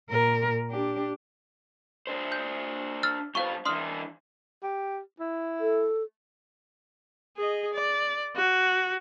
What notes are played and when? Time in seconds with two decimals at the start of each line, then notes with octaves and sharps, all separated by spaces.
0.10 A#2 A#4
0.71 D4 G4
2.07 D4 C5
2.32 G6
3.03 E6 F6 A6
3.35 G2 F4 C5 F5 C#6
3.65 E3 D4 C6 D#6 F6
4.63 G4
5.20 E4
5.61 A4
7.37 G#4 D#5
7.73 D5
8.36 F#4